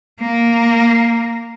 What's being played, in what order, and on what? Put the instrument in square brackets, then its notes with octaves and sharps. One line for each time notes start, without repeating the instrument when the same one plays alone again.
[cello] A#3